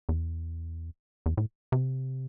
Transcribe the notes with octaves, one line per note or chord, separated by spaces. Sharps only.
E2
E2
A2
C3